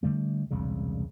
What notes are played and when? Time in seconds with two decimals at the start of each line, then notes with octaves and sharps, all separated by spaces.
0.03 D3 G3 A3
0.51 E1 C2 C#3